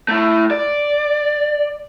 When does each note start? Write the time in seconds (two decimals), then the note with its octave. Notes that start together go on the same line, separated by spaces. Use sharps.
0.08 A3 E4
0.51 D5